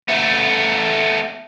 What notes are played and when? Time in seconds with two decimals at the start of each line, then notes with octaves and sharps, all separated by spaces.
0.08 A3 B3